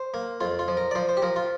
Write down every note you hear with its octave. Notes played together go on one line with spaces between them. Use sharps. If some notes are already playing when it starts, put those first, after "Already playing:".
Already playing: C5
A#3
F2 F4
F4
F3
A#4
D5
F3 C5
C5
G4
F3 A#4
F4